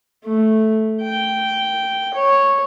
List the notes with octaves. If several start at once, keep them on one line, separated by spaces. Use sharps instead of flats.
A3
G5
C#5